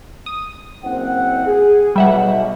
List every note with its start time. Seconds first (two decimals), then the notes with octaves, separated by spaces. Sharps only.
0.26 D#6
0.83 F#1 C4 F#5
1.47 G#4
1.96 B1 B2 G3 E5 F#5